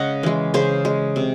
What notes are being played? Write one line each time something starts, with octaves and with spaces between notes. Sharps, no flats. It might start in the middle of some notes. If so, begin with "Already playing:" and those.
Already playing: C#3 G#3 D#5 F#5
E3 G#3
C#3 G#4 C5
G#3
C3